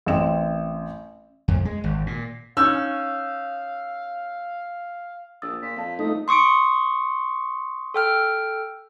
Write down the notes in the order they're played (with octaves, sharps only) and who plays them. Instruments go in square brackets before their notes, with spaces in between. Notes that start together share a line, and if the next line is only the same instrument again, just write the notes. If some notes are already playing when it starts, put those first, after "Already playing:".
[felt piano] A1 C4 E7
[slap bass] F2
G#3
G#1
A#2
[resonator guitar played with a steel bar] C#4 D#4 [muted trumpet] F5 [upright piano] E6
[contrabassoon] A#1 [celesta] D#6 E6 A6
[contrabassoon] A#2 [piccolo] B6
[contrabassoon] F2 [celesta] F5 A5
[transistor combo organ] A3 D#4 [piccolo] D#6
[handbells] C6 C#6 D#6 C#7 D7
A4 G5 F6